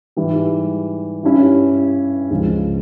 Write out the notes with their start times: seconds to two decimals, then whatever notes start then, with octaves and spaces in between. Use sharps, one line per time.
0.17 G#2 E3 G3
1.23 G2 G3 C#4 E4
2.31 C#2 C#3 F3 G#3